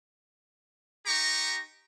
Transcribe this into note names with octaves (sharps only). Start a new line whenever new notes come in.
D#4 G4 A#5 C#6